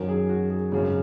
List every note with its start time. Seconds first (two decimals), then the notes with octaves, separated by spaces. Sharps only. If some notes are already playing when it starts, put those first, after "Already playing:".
Already playing: F#2 D#3 F#3 A#4
0.09 G#4
0.29 F#4
0.50 G#4
0.72 G#1 F#2 C#3